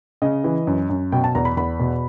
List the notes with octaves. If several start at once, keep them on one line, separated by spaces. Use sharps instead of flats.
C#3 D#5
E3
F#2
F#2
B2 G5
A5
E2 A#5
B5
E2 B5
B2